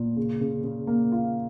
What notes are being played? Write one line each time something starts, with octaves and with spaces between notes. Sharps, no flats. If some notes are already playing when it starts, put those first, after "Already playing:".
Already playing: A#2
C#3
C#3
C#3
A#3
F4